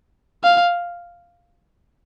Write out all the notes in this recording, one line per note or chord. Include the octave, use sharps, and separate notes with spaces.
F5